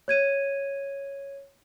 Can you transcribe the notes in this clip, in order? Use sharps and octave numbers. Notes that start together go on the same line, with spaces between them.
C#5 G#6 D#7